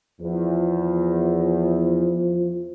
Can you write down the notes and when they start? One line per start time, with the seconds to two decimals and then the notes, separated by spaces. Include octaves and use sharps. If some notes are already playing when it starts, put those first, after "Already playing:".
0.21 E2 F3